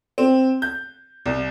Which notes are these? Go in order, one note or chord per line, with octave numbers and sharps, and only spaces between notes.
C4
G6
C2